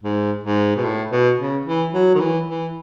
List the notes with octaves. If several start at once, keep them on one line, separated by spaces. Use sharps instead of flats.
G#2
G#2
B2
A2
B2
C#3
E3
F#3
D#3
E3
E3